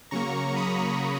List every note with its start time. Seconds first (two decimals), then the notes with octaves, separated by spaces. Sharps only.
0.11 C#3 F#3 A#3 A#5 C#6
0.56 B5 D#6